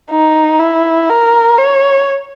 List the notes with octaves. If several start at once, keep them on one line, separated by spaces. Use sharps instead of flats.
D#4
E4
A#4
C#5